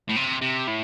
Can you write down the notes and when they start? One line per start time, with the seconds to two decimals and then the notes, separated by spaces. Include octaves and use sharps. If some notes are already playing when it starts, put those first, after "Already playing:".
0.09 A2
0.16 C3
0.41 C3
0.67 A2